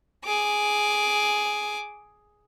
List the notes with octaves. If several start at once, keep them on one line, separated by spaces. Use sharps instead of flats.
G#4 D6